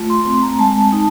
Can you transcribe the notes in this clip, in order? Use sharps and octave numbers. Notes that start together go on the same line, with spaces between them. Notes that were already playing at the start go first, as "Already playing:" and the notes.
Already playing: A3 F4
C6
C4 C6
A#5
G#3 A5
D#4